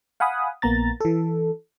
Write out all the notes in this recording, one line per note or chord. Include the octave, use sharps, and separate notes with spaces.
F5 F#5 G#5 B5 D#6
A#1 A#3 B3 A#5 A6
E3 A4